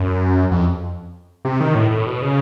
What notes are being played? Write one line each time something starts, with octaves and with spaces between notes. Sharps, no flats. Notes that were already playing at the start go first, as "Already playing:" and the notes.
Already playing: F#2
F2
C3
D#3
A2
A2
B2
C#3